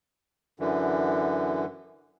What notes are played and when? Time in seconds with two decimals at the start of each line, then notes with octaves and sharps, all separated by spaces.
0.60 F#2 D3 E3